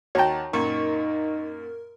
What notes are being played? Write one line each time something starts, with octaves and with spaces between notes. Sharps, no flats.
D#2 F#4 C#5 G5 A5 A#5
F#2 A#2 D#4 A#4 C#6